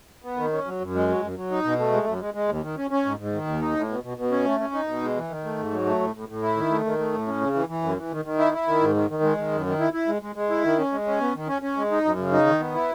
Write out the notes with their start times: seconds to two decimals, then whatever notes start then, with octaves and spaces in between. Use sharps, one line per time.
0.24 B3
0.37 D#3
0.52 C#4
0.66 F#3
0.80 F#2
0.95 G#3
1.08 F#3
1.22 F#2
1.36 F#3
1.51 D#4
1.64 B2
1.79 A3
1.92 G#3
2.07 F#2
2.21 G#3
2.34 G#3
2.49 D#2
2.63 D#3
2.77 C#4
2.91 C#4
3.05 G#2
3.19 G#2
3.33 D#3
3.47 D#2
3.61 D#4
3.76 A2
3.89 B2
4.04 B2
4.17 B2
4.31 C#4
4.45 A3
4.60 C#4
4.74 D#4
4.88 B2
5.02 G#3
5.16 E3
5.29 D#3
5.44 A3
5.58 G#2
5.72 F#3
5.86 A3
6.00 A2
6.15 A2
6.29 A2
6.43 E4
6.57 D#3
6.70 A3
6.85 D#3
6.98 A3
7.13 A2
7.27 C#4
7.41 C#3
7.54 E3
7.69 E3
7.83 F#2
7.98 E3
8.11 D#3
8.25 D#3
8.39 E4
8.54 E4
8.67 D#3
8.81 G#2
8.95 D#3
9.10 D#3
9.23 G#3
9.38 D#3
9.52 F#2
9.66 D#3
9.80 E4
9.93 E4
10.08 G#3
10.22 G#3
10.36 G#3
10.50 E4
10.64 D#3
10.78 C#4
10.92 G#3
11.07 C#4
11.20 B3
11.35 D#3
11.48 C#4
11.62 C#4
11.77 G#3
11.91 D#4
12.05 F#2
12.19 C#3
12.33 D#4
12.47 D#3
12.60 B3
12.75 E4